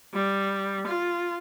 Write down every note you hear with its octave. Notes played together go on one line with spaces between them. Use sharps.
G3
F4